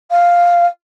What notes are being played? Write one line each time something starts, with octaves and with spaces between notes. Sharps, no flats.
F5